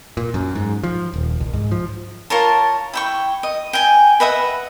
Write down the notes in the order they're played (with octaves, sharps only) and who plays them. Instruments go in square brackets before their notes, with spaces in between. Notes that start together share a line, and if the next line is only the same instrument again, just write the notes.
[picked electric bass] A#2
F#2
G#2
F3
D#1
C2
G#2
F3
[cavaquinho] F4 A#4 C#5 A5
E4 G5 C#6
D#5
G5 G#5
B4 D#5 E5 F#5